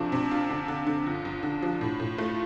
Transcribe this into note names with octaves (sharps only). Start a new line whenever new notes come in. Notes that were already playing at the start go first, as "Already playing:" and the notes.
Already playing: C3 F3 A3 D4
C3
F4
D3
D3
D3
G1 F4
G1
D3 D4
F3
A2 F4
A2
A3